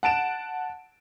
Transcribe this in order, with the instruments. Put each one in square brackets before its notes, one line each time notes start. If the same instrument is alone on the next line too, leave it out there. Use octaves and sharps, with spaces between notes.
[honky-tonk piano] F#5 A5 D7 E7